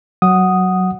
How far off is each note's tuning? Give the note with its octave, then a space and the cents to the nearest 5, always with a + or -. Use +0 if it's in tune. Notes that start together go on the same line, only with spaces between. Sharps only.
F#3 +5 F#5 +0 D#6 +0